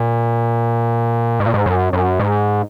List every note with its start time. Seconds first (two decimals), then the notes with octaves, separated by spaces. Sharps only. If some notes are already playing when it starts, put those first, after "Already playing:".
Already playing: A#2
1.40 G#2
1.46 A#2
1.54 G#2
1.66 F#2
1.93 F#2
2.19 G#2